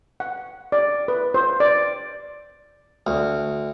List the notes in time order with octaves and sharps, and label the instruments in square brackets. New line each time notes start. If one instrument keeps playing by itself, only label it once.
[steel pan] F#5
D5
B4
C5
D5
[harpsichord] D2